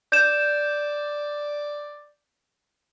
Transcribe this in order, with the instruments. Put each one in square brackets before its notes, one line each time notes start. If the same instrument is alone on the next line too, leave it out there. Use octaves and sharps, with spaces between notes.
[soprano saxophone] D5 [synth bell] G6 E7